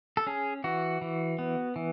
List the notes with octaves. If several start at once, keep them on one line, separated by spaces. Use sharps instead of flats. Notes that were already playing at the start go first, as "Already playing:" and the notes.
A4
C#4 G#4
E3 F#4
E3
B3
E3